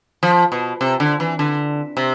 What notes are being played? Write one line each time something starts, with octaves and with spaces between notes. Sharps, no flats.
F3
B2
C3
D3
E3
D3
C3